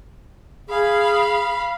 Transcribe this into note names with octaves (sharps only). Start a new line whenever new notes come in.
G#4 F5 B5